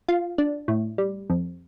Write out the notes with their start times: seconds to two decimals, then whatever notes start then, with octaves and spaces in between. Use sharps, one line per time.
0.08 F4
0.38 D4
0.68 A2
0.98 G3
1.30 F2